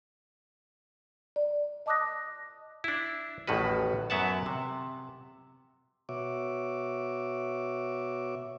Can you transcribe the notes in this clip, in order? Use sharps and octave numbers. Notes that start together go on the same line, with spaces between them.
D5
D#5 A5 D6 D#6 F#6 A#6
D4 E4
A1 E2 A2 D#3 F#4 B4
F#2 F#3 B3 E5 F#5 A5
C3
B2 F#4 C#5 E5 D6